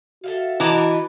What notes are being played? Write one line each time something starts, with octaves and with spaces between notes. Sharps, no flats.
F#4 A4 E5 F5
E3 D#4 B4 D#5 A5 A#5 D6